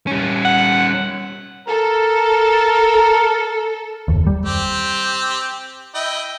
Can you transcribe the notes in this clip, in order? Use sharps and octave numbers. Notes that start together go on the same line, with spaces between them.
G3 C#4
F#5
A4 A#4
F#1 D#2
G3
C4 G4
E4 D#5 G5